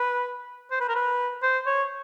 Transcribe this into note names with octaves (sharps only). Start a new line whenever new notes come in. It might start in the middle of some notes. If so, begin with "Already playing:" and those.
Already playing: B4
C5
B4
A#4
B4
C5
C#5